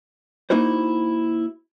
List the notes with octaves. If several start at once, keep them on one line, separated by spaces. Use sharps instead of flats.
A#3 D#4 E4 F#4 C5